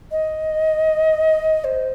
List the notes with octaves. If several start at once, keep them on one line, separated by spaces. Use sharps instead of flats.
D#5
C5